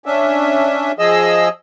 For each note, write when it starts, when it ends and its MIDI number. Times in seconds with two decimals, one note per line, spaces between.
0.06 0.92 61
0.06 0.92 62
0.06 0.92 76
0.99 1.49 53
0.99 1.49 68
0.99 1.49 75
0.99 1.49 88